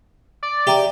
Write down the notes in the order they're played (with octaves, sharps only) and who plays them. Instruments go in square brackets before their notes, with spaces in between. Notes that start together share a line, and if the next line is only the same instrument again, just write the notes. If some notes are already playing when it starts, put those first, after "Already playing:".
[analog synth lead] D5
[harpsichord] G4 [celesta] E5 A#5